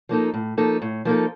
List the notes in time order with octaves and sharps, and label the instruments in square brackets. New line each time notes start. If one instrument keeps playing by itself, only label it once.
[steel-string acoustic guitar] F3 A#3 D#4 A4
A2
F3 A#3 D#4 A4
A2
F3 A#3 D#4 A4